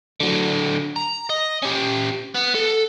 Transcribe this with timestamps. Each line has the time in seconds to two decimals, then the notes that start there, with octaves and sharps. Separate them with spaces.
0.20 D3 F#3
0.96 A#5
1.29 D#5
1.62 C#4 G4
2.35 B3
2.55 A4